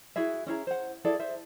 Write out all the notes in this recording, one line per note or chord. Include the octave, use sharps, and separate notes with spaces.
E4 F#4 G#4 E5
C#4 E4 G#4 A#5
C5 F#5
E4 G#4 A4 D5
C5 E5